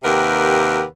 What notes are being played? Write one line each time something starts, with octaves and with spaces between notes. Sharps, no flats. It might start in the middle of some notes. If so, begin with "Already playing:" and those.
D#2 C3 G4 A#4 B4 F#5